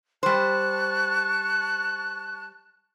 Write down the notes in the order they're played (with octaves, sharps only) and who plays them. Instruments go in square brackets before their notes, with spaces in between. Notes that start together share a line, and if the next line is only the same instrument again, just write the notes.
[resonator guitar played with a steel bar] G3 C5 [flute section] A5 C#6 F#6